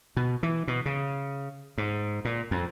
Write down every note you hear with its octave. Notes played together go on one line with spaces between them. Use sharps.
B2
E3
B2
C#3
G#2
A#2
F2